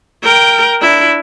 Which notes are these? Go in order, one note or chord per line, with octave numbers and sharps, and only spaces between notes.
A#4 G5
D4 E4